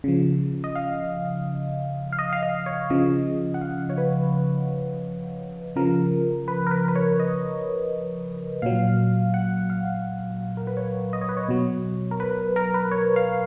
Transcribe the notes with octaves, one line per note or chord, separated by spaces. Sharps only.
C#3 F3
D#5
F5
F5
D#5
F5
D#5
C#5
C#3 F3 D#5
F#5
F5
C#5
B4
C#3 F3 A#4
B4
A#4
B4
B4
C#5
D#5
A#2 F#3 F5
F#5
F5
A#4
B4
C#5
D#5
C#5
B4
C#5
B2 F#3
A#4
B4
A#4
B4
C#5
F5